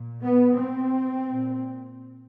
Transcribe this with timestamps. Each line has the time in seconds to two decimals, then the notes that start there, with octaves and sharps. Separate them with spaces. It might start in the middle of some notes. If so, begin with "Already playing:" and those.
Already playing: A#2
0.21 B3
0.57 C4
1.29 A#2